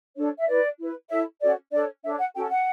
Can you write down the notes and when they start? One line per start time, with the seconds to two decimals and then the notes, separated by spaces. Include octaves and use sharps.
0.17 D4 A4 C#5
0.39 E5
0.47 E4 B4 D5
0.79 E4 B4
1.10 E4 A4 C#5 E5
1.41 C#4 F#4 A4 C#5 D5
1.72 D4 A4 C#5 D5
2.04 D4 A4 C#5 E5
2.19 F#5
2.35 C#4 F#4 A4 G5
2.50 F#5